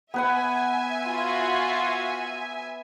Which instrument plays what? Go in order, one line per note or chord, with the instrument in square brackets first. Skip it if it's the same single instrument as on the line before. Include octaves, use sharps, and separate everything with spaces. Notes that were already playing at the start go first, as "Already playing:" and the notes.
[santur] B3 B4 F#5 [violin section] E5 G#5
[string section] F4 F#4